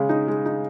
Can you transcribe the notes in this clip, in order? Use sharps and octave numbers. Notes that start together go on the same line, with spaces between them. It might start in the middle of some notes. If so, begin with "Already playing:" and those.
Already playing: C#3 G#3
D#4
G#3
D#4